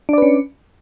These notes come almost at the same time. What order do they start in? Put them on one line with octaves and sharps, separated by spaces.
D4 D5 B4 C#4